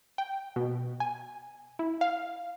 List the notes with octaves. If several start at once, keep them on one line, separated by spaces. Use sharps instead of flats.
G5
B2
G#5
E4
F5